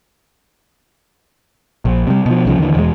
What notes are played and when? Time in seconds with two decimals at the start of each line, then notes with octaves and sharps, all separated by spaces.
1.85 A#1
2.07 C3 G3
2.26 B2 F3
2.45 C2 C#3 F3
2.58 D#2 D3 E3
2.75 E1 E2 E3 G#3